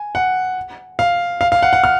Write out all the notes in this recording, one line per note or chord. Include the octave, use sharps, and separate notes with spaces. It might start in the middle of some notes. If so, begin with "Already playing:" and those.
Already playing: G#5
F#5
F5
F5
F5
F#5
F#5
F6